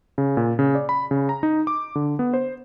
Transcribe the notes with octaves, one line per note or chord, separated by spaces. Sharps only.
C#3
A#2
C#3
D5
B5
C#3
A#5
D#4
D6
D3
B3
C5